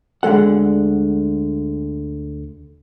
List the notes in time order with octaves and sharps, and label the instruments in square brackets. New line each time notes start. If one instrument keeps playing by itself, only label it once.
[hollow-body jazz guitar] D2 D3 G#3 A4 F#5